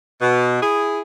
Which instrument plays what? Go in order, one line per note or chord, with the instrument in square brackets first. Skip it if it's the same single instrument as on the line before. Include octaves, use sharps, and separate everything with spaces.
[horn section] B2
E4 G#4